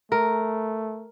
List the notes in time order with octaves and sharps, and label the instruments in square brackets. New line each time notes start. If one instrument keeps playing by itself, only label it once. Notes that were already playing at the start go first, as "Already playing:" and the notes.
[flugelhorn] A3 [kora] A#4